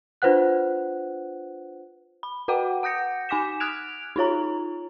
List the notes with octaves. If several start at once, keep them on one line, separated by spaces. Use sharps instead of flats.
D4 F4 B4 C5 F#5 F#6
B5
F#4 B4 F#5 G5 D6
F#5 D#6 G6 A#6 C#7
D#4 G#5 D6 B6 E7
D#6 F6 F#6 G#6 D7 F7
D#4 F4 C#5 A#5